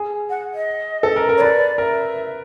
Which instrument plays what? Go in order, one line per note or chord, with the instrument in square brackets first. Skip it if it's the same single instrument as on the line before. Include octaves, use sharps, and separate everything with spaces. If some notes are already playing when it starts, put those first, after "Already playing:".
Already playing: [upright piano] G#4
[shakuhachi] F#5
D#5
[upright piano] A4
A#4
A#4
[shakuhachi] C#5
[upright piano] B4 [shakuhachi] D5
[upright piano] A#4 [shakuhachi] E5